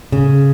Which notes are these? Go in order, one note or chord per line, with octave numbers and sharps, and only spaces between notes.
C#3